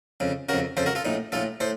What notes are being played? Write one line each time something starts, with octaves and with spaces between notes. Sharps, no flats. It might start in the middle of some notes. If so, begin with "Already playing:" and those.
F2 C#3
F2 C#3 F#4 A#4
F2 C#3 A4 C5
F#4 A#4
F4 A4
A#1 A2 D#4
A#1 A2 F4 A4
A2 A4 C5